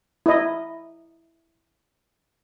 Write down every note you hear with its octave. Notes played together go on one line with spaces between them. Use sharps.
E4 D#5